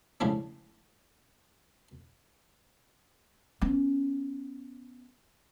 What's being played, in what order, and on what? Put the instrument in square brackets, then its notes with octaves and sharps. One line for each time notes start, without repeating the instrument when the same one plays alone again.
[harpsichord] A2 C#3 F3 G3 G#3 D4
[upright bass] B3 C#4